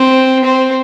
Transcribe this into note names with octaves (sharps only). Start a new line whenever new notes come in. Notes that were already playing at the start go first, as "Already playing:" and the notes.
Already playing: C4
C4